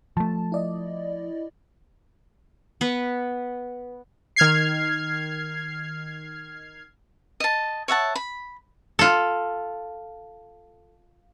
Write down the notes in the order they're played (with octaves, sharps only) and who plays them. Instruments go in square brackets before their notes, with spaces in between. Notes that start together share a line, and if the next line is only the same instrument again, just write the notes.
[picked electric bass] F3 A3 [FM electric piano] A5
[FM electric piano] E4 D5 D#5
[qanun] B3 B4
[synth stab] D#3 F6 G#6 C7
[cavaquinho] D#5 A5
C#5 E5 F#5 A5
B5
[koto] F4 A4